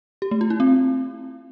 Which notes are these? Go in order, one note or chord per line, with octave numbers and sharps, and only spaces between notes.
G4
A3
F4
E4
C4